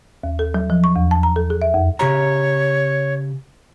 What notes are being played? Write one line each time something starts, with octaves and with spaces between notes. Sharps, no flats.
D#2
A4
F#3
F3
C#6
E2
A5
A#5
A4
G#4
E5
F2
C#3 G4 C#5 A#5